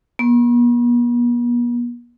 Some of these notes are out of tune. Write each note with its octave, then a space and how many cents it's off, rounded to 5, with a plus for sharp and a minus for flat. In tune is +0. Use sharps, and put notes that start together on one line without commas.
B3 -45